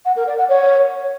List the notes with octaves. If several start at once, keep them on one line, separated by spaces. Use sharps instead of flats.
F#5
A#4
D5
F#5
C#5